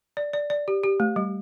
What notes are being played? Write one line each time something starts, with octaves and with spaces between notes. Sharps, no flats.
D5
D5
D5
G4
G4
A3
G3